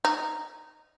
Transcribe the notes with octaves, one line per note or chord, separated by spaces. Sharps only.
D#4